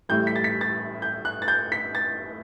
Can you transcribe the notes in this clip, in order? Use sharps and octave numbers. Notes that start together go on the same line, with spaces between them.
A1 A2 G3 G6
B6
A6
B6
A6
G6
F#6
A6
G6
B6
A6